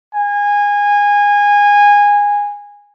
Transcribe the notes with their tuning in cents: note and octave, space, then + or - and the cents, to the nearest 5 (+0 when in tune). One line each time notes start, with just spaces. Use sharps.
G#5 -20